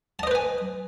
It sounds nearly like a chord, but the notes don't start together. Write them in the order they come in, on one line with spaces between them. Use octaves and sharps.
A5 D#5 C5 B4 G#5